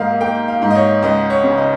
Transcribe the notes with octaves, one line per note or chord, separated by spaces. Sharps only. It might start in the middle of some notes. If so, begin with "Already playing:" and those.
Already playing: G#2 A#3 D#5 F5
A#3 G5
F5
G#2
D#5
C#5
C#2 D#5
C#5
C#3
D#5